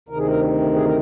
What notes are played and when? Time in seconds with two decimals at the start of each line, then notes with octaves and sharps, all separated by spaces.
0.08 D2 C3 D#3 A#4
0.18 G#4
0.26 A#4
0.74 G#4
0.85 A#4